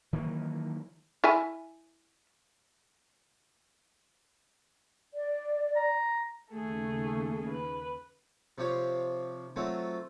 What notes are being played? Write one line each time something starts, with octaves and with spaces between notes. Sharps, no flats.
D#3 E3 F#3 A#3
E4 E5 G#5
D5
A#5
D#2 C#3 A3 G#4 A4
B4
C3 F3 G4 C#5 F5
F#3 A3 C4 F4